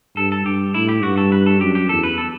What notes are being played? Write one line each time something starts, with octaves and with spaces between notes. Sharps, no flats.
G2 A4
A4
G2 G4
A2 E4
G4
G2 F#4
A4
B4
A4
F#2 G4
G4
E2 A4
B4
A4